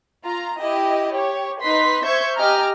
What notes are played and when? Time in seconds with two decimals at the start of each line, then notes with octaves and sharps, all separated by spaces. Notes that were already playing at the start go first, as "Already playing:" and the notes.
0.25 F4 A#5
0.61 E4 G4 D#5
1.11 G4 C#5
1.61 D#4 B4 C6 B6
2.03 C5 E5 C#6 G6 G#6
2.36 G4 D#5 G#5 A#5 F6